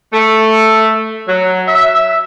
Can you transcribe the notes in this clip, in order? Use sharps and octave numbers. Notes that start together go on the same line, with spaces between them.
A3
F#3
E5